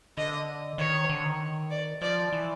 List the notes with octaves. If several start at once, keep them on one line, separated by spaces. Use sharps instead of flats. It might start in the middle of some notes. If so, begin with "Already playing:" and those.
D3 D#5
D#3 C#5
D3
D#3
D5
F3 D5
E3